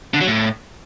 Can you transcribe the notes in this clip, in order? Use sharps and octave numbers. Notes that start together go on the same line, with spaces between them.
D3
F#3
A2